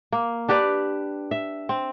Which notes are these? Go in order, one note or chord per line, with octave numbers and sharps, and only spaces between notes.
A#3
D4 G4 B4 D5
E5
C4